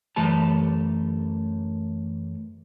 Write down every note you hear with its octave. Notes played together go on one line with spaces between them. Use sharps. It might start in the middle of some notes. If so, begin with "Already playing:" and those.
F#2 E3 A3 G4 A5